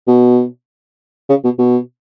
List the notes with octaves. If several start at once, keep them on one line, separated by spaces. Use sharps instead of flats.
B2
C#3
B2
B2